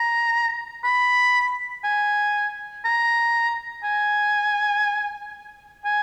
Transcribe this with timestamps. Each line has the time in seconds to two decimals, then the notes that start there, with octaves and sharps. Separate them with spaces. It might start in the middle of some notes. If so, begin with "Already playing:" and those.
Already playing: A#5
0.84 B5
1.84 G#5
2.85 A#5
3.84 G#5
5.85 G#5